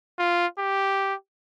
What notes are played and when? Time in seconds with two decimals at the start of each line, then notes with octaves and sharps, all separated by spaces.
0.19 F4
0.59 G4